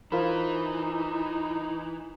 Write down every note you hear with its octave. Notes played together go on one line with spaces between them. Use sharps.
E3 D#4 F4 A#4 C5 B5